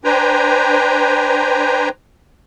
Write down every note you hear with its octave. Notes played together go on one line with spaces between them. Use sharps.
D4 B4 C5 G5 G#5 A#5